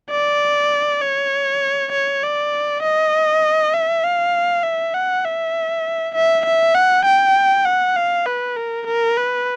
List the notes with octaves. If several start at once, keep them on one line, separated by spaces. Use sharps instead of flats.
D5
C#5
C#5
D5
D#5
E5
F5
E5
F#5
E5
E5
E5
F#5
G5
F#5
F5
B4
A#4
A#4
B4